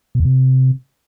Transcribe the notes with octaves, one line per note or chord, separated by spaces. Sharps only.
B2
E2
C3